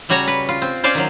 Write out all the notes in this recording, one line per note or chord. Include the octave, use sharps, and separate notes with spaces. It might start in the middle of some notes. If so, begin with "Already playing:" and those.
C#3 G3 F#4 C#5 A#5
B4
F4
C4
C#4 C5 D5 F5 G#5
D#3 F#3